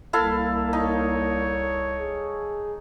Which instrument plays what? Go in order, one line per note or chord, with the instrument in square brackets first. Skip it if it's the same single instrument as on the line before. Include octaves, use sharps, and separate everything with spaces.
[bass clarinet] C2 [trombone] A#3 [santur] E4 A4 F5
[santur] D#4 [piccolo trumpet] C#5
[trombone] G#4